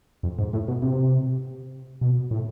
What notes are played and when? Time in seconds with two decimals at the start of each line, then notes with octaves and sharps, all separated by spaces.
0.23 F2
0.39 G#2
0.53 A2
0.68 B2
0.82 C3
2.01 B2
2.31 A2